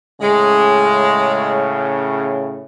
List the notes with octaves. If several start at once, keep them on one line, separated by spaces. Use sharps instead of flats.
A2 C#3 G#3